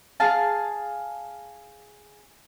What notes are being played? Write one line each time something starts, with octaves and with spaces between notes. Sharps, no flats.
G#4 F5 A5